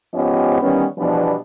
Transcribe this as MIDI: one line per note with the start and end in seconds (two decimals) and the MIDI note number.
0.14 0.57 44
0.14 0.57 53
0.14 0.57 59
0.14 0.57 61
0.14 0.57 67
0.14 0.57 75
0.62 0.86 51
0.62 0.86 52
0.62 0.86 55
0.62 0.86 59
0.62 0.86 61
0.98 1.36 47
0.98 1.36 52
0.98 1.36 53
0.98 1.36 55
0.98 1.36 59
0.98 1.36 62